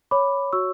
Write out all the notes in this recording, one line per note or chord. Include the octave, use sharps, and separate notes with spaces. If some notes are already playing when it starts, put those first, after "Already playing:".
C#5 B5 D6
F#4 C#6 E6